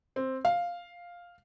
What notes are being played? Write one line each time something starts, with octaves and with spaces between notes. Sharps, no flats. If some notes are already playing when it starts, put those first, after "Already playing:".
C4
F5